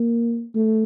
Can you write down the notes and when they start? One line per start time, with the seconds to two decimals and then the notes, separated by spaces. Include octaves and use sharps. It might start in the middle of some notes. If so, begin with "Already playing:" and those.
Already playing: A#3
0.55 A3